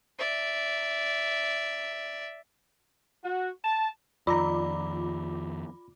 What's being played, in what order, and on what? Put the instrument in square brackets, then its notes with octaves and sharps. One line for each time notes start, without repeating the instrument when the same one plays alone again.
[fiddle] D5 E5
[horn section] F#4
A5
[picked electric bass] F2 D#3 [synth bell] F4 D6 [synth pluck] D5 A#5 [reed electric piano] B5